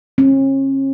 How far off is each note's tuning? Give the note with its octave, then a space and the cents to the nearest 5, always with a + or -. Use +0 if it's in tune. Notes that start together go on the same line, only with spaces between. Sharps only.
C#4 -40